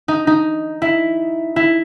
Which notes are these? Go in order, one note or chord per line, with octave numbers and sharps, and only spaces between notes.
D#4
D#4
E4
E4